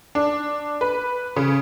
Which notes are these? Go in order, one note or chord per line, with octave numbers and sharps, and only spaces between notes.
D4
B4
C#3